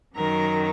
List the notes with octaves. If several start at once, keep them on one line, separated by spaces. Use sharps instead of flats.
F#2 D#3 F#3 A#4